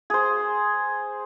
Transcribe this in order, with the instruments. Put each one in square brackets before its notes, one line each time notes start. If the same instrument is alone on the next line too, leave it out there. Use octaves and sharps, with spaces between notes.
[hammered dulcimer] G#4 C5